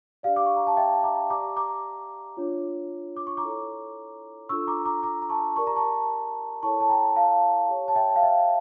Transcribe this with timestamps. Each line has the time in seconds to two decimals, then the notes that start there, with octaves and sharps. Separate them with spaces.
0.23 D4 G4 D5 F5
0.36 D6
0.46 C#6
0.56 A#5
0.67 A5
0.77 E5 G5
1.04 A#5 D6
1.30 G4 D5 A#5 D6
1.57 A#5 D6
2.37 D4 F4 C#5
3.17 D6
3.27 C#6
3.37 A#5 D6
3.43 E4 A4 C#5
4.49 D4 F4 A4 C#6 E6
4.67 A#5 D6
4.85 A#5 D6
5.03 A#5 D6
5.22 A#5
5.29 A5 C#6
5.56 G4 A#4 D5 C#6
5.67 A#5
5.76 A5 C#6
6.63 E4 A4 C#5 A5 C#6
6.80 A5
6.90 G5 A#5
7.16 F5 A5
7.69 G4 C#5
7.88 A5
7.96 E5 G5
8.16 F5
8.22 E5 G5